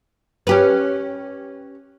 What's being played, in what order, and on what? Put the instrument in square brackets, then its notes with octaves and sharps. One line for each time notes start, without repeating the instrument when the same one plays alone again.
[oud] C#4 G4 B4